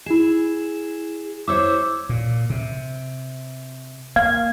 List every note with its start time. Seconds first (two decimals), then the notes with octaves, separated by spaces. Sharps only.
0.06 E4 G#4 E7
1.48 E4 C5 C#5 D6 E6
2.09 A#2
2.50 C3
4.16 A#3 F5 G#6